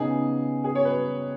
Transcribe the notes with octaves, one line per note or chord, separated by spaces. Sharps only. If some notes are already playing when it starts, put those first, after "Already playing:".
Already playing: C#3 B3 D#4 G#4
G#4
C#5
B4